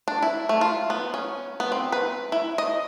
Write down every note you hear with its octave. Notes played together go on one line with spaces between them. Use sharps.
D4
E4
A3
F4
B3
C#4
B3
C4
B4
E4
D#5